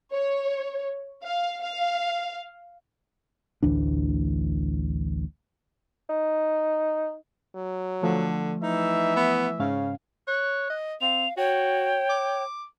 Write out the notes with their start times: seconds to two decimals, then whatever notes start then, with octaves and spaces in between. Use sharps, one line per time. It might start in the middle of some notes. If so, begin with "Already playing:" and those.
0.13 C#5
1.23 F5
1.61 F5
3.63 A1 D2 E3 D4
6.10 D#4
7.55 F#3
8.03 D3 F3 A3
8.63 E3 D#4 E5
9.16 B3
9.60 G#2 C#3 C#4 F5
10.28 C#5 F#6
10.70 D#5
11.01 C4 F5 F7
11.37 F#4 C#5 G5
12.09 D6